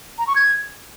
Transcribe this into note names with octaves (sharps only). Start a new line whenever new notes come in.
A#5
C#6
G#6